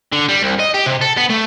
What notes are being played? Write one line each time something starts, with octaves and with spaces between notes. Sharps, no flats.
D3
G3
C2
D#5
G4
C3
A4
B3
A3